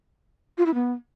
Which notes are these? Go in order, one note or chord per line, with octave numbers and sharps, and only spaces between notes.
F4
E4
B3